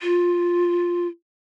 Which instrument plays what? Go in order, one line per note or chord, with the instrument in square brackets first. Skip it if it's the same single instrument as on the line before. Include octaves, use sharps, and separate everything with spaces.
[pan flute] F4